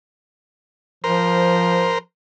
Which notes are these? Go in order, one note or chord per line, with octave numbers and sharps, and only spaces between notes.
F3 A#4 C5